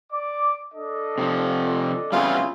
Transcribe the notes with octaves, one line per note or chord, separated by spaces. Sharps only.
D5 D6
D4 A4 D#5
C3 E3 F3
C#3 G3 B3 C4 E4 F4 G#4